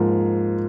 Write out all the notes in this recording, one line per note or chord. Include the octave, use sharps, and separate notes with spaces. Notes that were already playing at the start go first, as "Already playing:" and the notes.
Already playing: G#2 F3 A#3